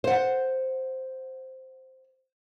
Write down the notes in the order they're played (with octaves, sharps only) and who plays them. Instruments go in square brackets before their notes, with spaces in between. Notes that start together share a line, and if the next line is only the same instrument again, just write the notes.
[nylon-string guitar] C5 F#5